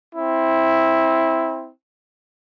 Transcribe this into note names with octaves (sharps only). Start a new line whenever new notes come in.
C4 E4